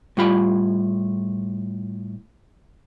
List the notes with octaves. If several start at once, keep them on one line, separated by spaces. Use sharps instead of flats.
A2 G3 F4 B5